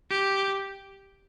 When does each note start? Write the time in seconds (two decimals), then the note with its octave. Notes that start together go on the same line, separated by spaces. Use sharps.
0.10 G4